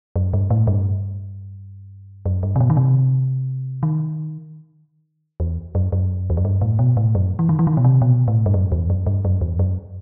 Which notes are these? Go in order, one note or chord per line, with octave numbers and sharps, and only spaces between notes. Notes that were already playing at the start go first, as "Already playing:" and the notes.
F#2
G2
A2
G2
F#2
G2
C3
B2
D#3
C3
D#3
E2
F#2
F#2
E2
F#2
G2
A2
B2
A2
F#2
E3
D#3
E3
D#3
B2
C3
B2
A2
G2
F#2
E2
F#2
G2
F#2
E2
F#2